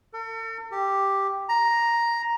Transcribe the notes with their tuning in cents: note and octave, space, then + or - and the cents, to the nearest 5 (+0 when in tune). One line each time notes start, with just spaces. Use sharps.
A4 +45
G4 +0
A#5 +5